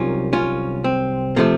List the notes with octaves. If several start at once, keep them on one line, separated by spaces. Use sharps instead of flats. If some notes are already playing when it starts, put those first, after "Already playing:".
Already playing: C2 C3 D#3 F#3 C#4 F4
C#4 F4
C4
C3 F3 A3 A#3